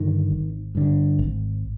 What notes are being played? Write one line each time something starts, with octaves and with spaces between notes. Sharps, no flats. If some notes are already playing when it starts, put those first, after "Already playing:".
Already playing: G2 D3 D#3
G#1
G2 D3
G#1